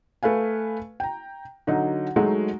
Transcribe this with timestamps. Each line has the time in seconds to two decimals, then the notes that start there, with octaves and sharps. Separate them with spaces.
0.23 A3 B4 F5 G#5
1.00 G5 A#5
1.67 D3 F#3 D#4
2.16 F#3 G#3 A3 D#4